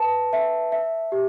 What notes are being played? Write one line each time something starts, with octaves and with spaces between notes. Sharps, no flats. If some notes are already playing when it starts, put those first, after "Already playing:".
Already playing: B4 A5
E5
E5
G4